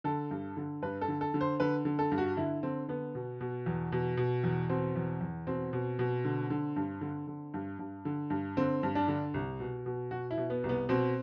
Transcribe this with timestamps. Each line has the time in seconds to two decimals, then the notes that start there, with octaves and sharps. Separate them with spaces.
0.04 D3 A4
0.31 G2
0.57 D3
0.82 G2 B4
1.01 A4
1.08 D3
1.21 A4
1.34 D3
1.41 C5
1.60 D3 B4
1.85 D3
1.99 A4
2.12 G2
2.18 F#4
2.37 D3 E4
2.63 D3 C4
2.88 D3 B3
3.15 B2
3.41 B2
3.66 E2
3.92 B2
4.17 B2
4.44 E2
4.69 B2 C4
4.96 E2
5.21 E2
5.47 B2 C4
5.73 B2
5.99 B2
6.25 D3
6.50 D3
6.76 G2
7.01 D3
7.27 D3
7.54 G2
7.79 G2
8.05 D3
8.30 G2
8.57 D3 C4
8.83 G2
8.95 D4
9.08 D3
9.34 C2
9.60 B2
9.86 B2
10.11 B2 F#4
10.31 E4
10.38 B2
10.50 B3
10.64 C2
10.69 B3
10.89 B2 C4